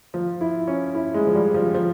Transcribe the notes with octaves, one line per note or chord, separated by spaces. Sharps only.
F3
E4
C#4
E4
G#3
F3
G3
F3
F3